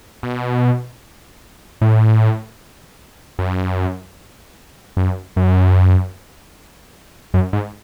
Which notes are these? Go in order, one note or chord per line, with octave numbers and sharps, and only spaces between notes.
B2
A2
F#2
F#2
F#2
F#2
G#2